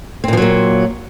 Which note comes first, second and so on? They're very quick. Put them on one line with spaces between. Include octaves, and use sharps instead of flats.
C4 A#2 F3 F#3 A#3